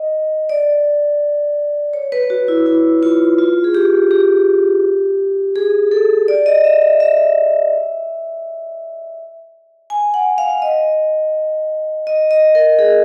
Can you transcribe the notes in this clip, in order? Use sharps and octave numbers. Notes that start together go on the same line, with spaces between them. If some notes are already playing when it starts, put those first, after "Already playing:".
Already playing: D#5
D5
C#5
B4
F#4
E4
E4
F4
F4
G#4
G4
G4
G#4
A4
D5
D#5
E5
E5
E5
G#5
F#5
F5
D#5
D#5
D#5
A#4
G#4